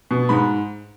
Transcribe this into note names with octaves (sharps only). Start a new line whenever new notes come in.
B2
G#2 B5